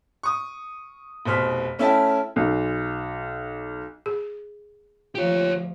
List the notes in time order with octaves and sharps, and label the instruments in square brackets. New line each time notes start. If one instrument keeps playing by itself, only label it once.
[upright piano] C#6 D#6
F1 B2 C5 F6 B6
A3 C#4 E4 E5 G5 A5
B1
[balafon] G#4
[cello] D2 F3 [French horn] F4 [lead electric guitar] G4 C#5